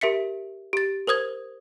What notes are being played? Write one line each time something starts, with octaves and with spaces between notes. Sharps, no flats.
G4 A#4 E5 B6 C#7
G4 A6
A#4 C5 D#6 G#6